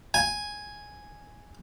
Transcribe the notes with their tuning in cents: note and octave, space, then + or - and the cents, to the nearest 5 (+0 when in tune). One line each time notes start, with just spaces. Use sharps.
G#5 +0